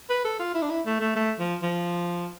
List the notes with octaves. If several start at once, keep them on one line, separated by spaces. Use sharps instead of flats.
B4
A4
F4
E4
D4
E4
A3
A3
A3
F3
F3